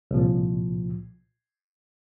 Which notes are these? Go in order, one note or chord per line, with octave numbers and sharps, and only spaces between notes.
C2 A#2 F3